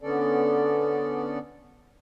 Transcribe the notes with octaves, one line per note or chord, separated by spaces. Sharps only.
D3 B3 C#4 A4 D5